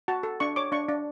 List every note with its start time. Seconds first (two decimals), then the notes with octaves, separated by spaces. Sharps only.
0.08 F#4 A5
0.23 A4
0.40 D4 C#6
0.56 C#5 D6
0.72 D4 C#6
0.89 D4